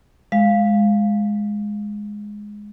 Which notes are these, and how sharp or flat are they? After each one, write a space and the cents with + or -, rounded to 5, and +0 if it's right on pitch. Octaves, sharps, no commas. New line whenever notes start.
G#3 +0 F5 +0